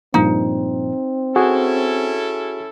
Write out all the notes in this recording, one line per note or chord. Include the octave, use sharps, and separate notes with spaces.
G2 A#2 F3 C4 D#4
C#4 E4 F#4 G#4 A4